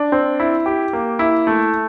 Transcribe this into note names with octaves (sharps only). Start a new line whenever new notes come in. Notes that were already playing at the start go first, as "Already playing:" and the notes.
Already playing: D4
C4
E4
G4
A#3
E4
A3